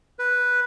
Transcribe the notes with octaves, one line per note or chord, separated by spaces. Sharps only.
B4